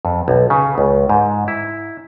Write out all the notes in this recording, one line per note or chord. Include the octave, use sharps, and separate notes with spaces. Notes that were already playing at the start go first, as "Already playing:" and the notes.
F2
B1
C#3
C#2
G#2
E4